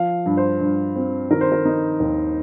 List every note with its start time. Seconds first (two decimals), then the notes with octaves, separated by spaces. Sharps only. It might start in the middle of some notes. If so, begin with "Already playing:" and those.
Already playing: F3 F5
0.26 G2
0.37 C5
0.61 G2
0.96 C4
1.31 D#3 A#4
1.41 C5
1.52 A#4
1.65 D#4
2.00 D#2